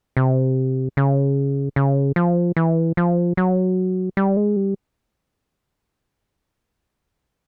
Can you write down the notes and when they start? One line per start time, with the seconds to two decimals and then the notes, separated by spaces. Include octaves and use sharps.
0.17 C3
0.97 C#3
1.76 C#3
2.16 F3
2.57 E3
2.97 F3
3.37 F#3
4.17 G3
4.37 G#3
4.56 G3